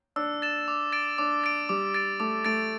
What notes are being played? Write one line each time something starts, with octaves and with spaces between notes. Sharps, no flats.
D4 E6
A6 E7
D6
A6 D7
D4 D6
A6 D7
G3 D6
A6 D7
A3 D6
A3 A6 D7